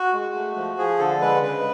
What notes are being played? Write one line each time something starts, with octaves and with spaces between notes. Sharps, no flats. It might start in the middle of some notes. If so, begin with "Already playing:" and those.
Already playing: F#4
G#3
A3
F3
F3 G#4
D3 A4
G#3 B4
C#3 B4